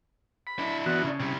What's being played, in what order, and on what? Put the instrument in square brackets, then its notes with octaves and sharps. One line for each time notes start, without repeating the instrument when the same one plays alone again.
[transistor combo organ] B5
[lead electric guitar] D4 E4
[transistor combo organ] E3 B3 F#4
C#3
[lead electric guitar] C3 G3